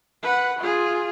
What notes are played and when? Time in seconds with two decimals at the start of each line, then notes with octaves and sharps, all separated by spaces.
0.22 B4 F#5
0.59 F4 G#4